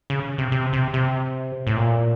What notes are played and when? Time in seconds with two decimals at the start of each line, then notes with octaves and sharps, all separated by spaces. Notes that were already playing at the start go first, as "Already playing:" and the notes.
0.10 C#3
0.38 C3
0.52 C3
0.73 C3
0.94 C3
1.67 A2
1.77 A#2